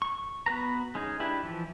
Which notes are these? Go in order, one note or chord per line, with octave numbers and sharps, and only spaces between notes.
C#6
B3 F#4 B4 A#5
G#3 C#4 D#4 G#4
D4 E4 G4 B4
E3 F3